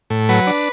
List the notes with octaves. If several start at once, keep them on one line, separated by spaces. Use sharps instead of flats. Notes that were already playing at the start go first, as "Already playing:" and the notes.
A2
F#3 B4
D4